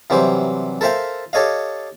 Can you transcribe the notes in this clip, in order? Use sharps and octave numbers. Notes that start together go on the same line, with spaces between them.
C3 E3 F#3 G3 C5
A4 A#4 C5 E5 F5 G5
G4 A4 C#5 D#5 F5